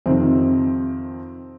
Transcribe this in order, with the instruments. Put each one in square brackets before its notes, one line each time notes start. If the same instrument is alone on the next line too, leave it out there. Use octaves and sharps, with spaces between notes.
[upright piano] F2 C3 D#3 C4